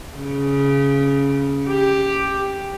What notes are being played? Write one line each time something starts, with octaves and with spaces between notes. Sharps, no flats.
C#3
G4